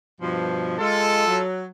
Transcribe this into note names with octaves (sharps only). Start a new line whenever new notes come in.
G2 B2 F3
G#3 F4 A4
F#3